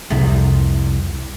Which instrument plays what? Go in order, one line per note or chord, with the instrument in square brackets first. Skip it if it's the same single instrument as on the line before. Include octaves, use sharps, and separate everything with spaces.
[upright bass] C2 F2